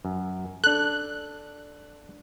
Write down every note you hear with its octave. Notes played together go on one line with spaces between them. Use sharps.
F#2
D4 A4 F#6